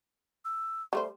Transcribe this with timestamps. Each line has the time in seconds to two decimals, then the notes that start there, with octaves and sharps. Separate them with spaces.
0.45 E6
0.93 G3 A3 C5 C6